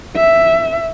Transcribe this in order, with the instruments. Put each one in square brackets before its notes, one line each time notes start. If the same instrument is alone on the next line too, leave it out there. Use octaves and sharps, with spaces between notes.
[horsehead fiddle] E5